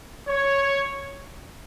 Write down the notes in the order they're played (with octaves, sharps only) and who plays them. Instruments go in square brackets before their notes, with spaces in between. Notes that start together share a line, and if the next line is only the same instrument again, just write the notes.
[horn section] C#5